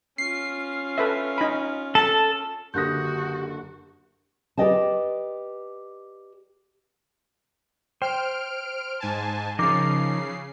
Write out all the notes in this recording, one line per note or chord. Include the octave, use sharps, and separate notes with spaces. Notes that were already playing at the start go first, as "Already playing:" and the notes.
C#4 F4 C7
A4 B4 E5
D#4 B5
A4 A5
F#1 D3 F#4 G4 D#6 F#6 G6 A#6
G4 B4 D5 D#5 G5 A5
C5 G5 F6 D7
G#2 G#5 A5
C#3 F3 D#4 A#4 D6 C7